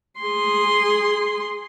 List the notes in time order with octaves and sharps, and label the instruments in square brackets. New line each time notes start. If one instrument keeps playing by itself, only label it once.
[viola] G#4 C6